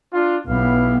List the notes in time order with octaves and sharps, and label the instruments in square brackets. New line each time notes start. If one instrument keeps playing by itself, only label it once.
[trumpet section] D4 F4
[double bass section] B1 B3 [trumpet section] E4 G4 F5